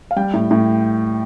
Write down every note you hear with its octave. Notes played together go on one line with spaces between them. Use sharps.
F5
G3 G5
A2
A2